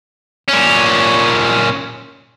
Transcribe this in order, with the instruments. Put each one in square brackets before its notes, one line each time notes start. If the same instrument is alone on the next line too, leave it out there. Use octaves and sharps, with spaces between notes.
[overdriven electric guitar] A#2 C#4